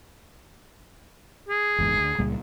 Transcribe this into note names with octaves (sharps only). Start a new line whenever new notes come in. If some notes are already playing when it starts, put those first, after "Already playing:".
G#4
F#1 E2 G#2
D2
C#2 A#2 G3